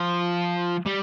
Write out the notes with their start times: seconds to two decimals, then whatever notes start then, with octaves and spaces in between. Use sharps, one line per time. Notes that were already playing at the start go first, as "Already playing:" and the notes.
Already playing: F3
0.86 G3